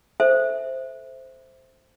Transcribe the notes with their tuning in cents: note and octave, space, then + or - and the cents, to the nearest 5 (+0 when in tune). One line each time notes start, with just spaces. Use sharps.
A4 +0 C5 +0 E5 +0